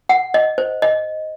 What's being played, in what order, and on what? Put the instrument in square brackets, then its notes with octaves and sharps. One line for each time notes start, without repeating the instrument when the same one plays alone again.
[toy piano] F#5
D#5
C5
D#5